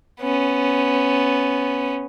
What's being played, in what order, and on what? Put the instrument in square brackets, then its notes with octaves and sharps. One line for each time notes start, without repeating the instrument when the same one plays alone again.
[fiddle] B3 C#4